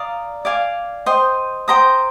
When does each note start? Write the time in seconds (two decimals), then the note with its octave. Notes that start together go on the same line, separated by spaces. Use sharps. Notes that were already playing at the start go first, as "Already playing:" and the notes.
Already playing: D5 F5 A#5 D#6
0.45 D5 F5 G#5 D6
1.06 C5 D#5 G5
1.68 C5 G5 A#5 D#6